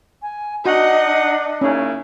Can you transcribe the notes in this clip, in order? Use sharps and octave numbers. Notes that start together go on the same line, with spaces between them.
G#5
D4 D#4 F#4 D#5 F#5
C#3 A#3 C#4 D#4 E4